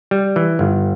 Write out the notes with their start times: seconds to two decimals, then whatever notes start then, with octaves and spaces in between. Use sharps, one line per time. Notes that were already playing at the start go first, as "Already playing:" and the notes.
0.11 G3
0.36 E3
0.59 G1